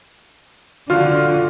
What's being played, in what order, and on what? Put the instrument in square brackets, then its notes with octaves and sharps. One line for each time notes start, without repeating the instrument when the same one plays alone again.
[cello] D3 [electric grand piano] F4 F#4 F6